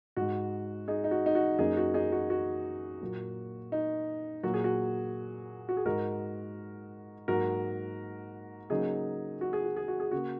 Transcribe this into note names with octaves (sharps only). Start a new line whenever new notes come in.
G#2 G#3 F#4
D#4 G#4
D#4
F#4
D#4
F#4
F#2 F#3 A#3 D#4 G#4
F#4
D#4 G#4
F#4
F#4
A#2 F#3 A#3
D#4
A#2 F#3 A#3 F#4
G#4
F#4
F#4
G#4
G#2 G#3 F#4 A#4
G#2 F#3 A#3 F#4 A#4
C#3 F#3 A#3 D#4 G#4
F#4
G#4
F#4
G#4
F#4
G#4
C#3 A#3 F#4